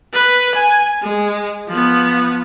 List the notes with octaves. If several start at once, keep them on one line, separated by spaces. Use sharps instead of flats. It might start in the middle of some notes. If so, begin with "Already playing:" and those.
B4
G#5
G#3
F3 B3